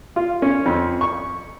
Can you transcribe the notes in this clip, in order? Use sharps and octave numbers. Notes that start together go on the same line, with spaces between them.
F4
C#4
F2
C#6